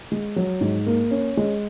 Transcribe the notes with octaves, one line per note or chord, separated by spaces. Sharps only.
G#3
F#3
G#2
A#3
C#4
G#3